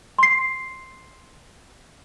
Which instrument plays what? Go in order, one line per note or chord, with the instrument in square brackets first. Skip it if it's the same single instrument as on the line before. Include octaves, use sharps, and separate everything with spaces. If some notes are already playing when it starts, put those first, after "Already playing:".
[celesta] C6 C7